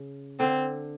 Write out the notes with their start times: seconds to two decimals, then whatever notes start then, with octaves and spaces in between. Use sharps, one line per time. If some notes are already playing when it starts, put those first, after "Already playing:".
Already playing: C#3
0.40 D3 C4